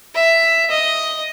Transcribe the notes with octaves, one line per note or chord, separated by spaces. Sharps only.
E5
D#5